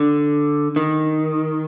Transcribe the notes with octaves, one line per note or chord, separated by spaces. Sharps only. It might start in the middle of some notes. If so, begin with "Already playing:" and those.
Already playing: D3
D#3